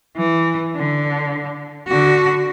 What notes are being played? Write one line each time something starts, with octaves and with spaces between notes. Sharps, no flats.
E3
D3
D3 F#4